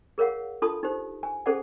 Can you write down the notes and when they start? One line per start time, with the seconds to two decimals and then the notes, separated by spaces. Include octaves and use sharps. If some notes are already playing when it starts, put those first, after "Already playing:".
0.18 G#4 A#4 C#5 F5 F#5
0.62 D4 F4 A4 A5 C6 D#6
0.83 D#4 G4 C5
1.23 G#5
1.46 C#4 G#4 A4 C5 D5 F#5